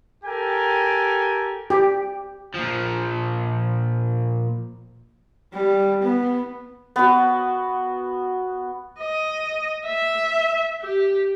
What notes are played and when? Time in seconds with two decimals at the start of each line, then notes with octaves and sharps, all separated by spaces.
0.24 G4 A4 A#4 G5 G#5
1.70 G4
2.55 A#2 F3
5.54 G3
6.02 B3
6.96 B3 F#4
9.00 D#5
9.86 E5
10.82 G4